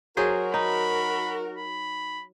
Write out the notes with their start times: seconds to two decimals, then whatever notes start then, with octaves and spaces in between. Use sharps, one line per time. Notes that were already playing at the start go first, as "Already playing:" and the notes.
0.17 F#3 F#4 G#4 A#4 C5
0.54 D#4 B5
1.58 B5